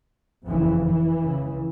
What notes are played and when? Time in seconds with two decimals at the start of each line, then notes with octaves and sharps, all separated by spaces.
0.46 F#1 F2 C#3 E3
0.85 E3
1.21 C#2 C#3